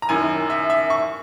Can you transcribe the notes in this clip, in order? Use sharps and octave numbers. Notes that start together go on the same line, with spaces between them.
A#5
F#2 D#3 G#5
E5
E5
C#6